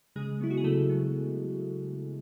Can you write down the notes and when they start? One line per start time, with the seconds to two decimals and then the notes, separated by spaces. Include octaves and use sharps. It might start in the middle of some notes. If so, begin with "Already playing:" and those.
0.16 C#3 G#3 G#4
0.40 F#3 B3 E4
0.50 F#4
0.57 G#4
0.64 C#3 A3 A4
0.90 F#3 B3